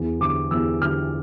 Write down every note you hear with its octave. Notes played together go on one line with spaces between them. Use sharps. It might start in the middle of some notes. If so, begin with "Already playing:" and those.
Already playing: E2
D3 D6
E2 E6
D3 F6